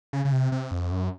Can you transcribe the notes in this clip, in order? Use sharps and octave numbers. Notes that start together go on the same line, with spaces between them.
C#3
C#3
C3
C3
F2
F#2